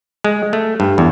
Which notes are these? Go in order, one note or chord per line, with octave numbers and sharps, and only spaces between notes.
G#3
A3
G2
E2